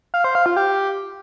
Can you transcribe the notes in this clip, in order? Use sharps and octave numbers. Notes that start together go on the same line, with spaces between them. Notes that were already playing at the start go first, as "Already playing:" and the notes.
F5
C5
F5
F4
G4